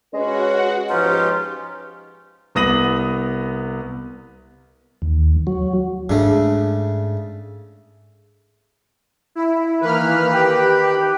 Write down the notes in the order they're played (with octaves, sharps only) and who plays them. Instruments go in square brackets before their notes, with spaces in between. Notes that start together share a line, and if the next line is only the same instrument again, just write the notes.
[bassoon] G#3 [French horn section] C#4 B4 [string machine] F#4 F#5
[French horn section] G#2 F3 B4 [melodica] C#4 D#4 F4 [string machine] G4
[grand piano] C2 B3 D#6 A#6 D#7 F#7
[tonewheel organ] D#2
F#3
[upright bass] G#2 [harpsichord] C#3 A3 [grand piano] D4
[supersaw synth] E4
[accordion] D#3 B4 [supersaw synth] E3 A#3 F6
[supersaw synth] G4